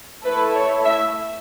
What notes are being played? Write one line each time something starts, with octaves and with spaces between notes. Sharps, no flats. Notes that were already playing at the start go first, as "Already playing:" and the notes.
A3 E4 A4 B4
C#5
E5